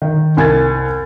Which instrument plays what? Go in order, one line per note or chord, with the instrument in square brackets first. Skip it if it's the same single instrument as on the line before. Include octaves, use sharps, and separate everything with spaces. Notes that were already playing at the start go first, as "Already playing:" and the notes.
[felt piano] D#3
C2 G#5 G#6 A6